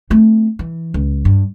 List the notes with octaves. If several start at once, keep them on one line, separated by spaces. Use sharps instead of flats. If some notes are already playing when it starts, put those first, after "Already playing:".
A3 C4
E3
C#2
G2